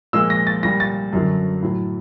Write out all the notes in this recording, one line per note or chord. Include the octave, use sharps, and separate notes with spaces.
A#2 F3 G#3 E6
A#6
A6
A#2 G3 A#6
A6
F#2 D3 F#3
A2 F#3